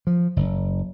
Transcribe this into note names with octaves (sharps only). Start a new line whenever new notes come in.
F3
F#1